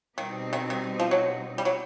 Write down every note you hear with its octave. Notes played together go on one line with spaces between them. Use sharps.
B2 D#3 G3 C4 D#4
D#3
D#3
F3
F#3
G3
F#3